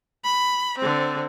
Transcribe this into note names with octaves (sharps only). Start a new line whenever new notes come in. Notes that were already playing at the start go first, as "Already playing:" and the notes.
B5
D3 C4